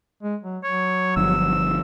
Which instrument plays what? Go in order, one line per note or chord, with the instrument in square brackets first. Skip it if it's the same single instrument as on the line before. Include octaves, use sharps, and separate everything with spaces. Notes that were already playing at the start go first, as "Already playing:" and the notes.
[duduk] G#3
F#3
[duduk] F#3 [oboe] C#5
[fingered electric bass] G1 G2 F3 [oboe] E6